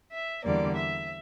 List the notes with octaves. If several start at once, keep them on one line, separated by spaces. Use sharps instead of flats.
E5
E2 D3 G3 A#3 D5
E5